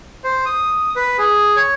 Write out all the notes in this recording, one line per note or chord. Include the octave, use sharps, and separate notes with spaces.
C5
D#6
B4
G#4
C#5